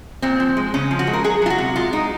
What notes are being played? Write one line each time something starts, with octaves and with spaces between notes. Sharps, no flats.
A#2 C4
F3
G#3
C#3 C#4
F3
F#4
G#3
A#4
F#3 G#4
F#3 F4
F#4
C3
G#3 F4
G#3 D#4